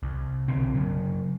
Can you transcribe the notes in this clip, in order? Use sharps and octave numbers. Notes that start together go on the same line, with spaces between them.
C2
B1 D3 C4
C#3 F#3